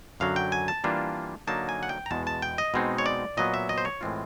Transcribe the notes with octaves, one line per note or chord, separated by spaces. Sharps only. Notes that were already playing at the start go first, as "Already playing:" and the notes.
F#2 D3 F#3 F5
G5
G#5
A5
E3 G3 A#3 D4 F4
D3 F#3 A#3 D#4 A5
G#5
F#5
G5
A#5
E2 B2 G#3 A5
A5
G5
D#5
B2 G#3 C4 D#4
C#5
D5
A#2 F#3 B3 D#5
E5
D#5
C5
C#5
A2 E3 G#3 C4 F4